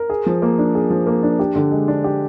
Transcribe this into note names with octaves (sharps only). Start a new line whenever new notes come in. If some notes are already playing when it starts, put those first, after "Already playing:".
Already playing: A#4
G#4
F3
A#3
D4
G#4
F3
A#3
D4
G4
D3
G#3
D4
G4